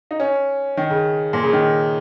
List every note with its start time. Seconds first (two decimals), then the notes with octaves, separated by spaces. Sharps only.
0.11 D#4
0.20 C#4
0.77 D#3
0.90 C#3
1.33 A#2
1.43 C#3
1.53 D#3